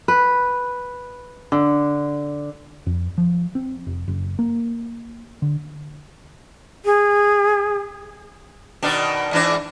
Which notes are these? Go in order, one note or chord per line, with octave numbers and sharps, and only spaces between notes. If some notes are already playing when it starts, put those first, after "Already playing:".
B4
D3
F2
F3
C4
F1
F#1
A#3
D3
G#4
B2 D#3 D4
G#2 E3 D4